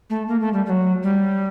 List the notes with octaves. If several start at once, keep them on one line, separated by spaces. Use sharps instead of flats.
A3
A#3
A3
G3
G3
F#3
G3